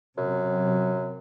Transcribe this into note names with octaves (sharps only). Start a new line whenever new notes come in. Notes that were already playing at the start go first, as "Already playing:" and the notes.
F#2 C3 F#3